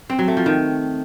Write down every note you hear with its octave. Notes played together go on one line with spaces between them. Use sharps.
C4
F#3
A3
F3
D#3